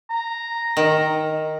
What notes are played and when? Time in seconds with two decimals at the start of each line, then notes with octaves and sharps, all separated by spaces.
0.10 A#5
0.77 D#3